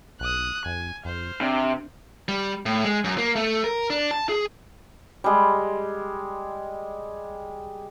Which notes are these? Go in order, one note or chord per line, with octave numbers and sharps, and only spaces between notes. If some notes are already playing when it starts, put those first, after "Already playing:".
B1 D#6 F#6
F2 G#5
F2 C5 F6
C3 D4
G3
A2
G#3
F#2
A#3
A3
A#4
D4
A5
G#4
G3 G#3